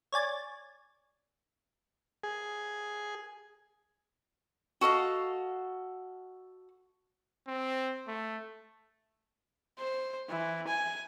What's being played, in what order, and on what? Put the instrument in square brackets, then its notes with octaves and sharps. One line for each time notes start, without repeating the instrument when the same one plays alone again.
[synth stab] C#5 D5 G#5 A6
[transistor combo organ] G#4
[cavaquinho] F#4 A4 D#5 F5
[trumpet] C4
A3
[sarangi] C5
E3
G#5